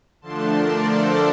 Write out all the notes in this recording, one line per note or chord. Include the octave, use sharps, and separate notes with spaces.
D3 F3 A3 D4 A5 C6
A#4 D5
A4 C5